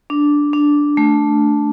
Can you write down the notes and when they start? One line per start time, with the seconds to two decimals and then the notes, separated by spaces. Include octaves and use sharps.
0.10 D4
0.53 D4
0.97 A3